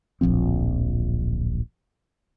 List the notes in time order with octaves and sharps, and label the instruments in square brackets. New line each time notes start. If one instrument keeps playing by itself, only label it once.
[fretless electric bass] D1 A#1 F3 C4